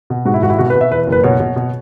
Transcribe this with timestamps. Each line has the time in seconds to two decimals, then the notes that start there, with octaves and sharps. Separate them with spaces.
0.10 B2
0.25 G#2 F#4
0.34 E4
0.42 G#1 F#4
0.50 E4
0.58 B2 F#4
0.70 B4
0.75 B2
0.81 E5
0.91 E2 B4
1.07 F#1 B4
1.23 B2 C#5
1.40 B2
1.56 B2